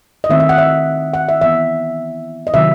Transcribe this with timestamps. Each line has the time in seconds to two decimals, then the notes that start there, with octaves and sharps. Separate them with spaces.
0.24 D#5
0.30 D#3 A3 C4 E5
0.40 E5
0.49 F#5
0.58 E5
1.14 F#5
1.29 E5
1.41 E3 B3 E5
2.47 D#5
2.54 C3 D#3 F#3 C4 E5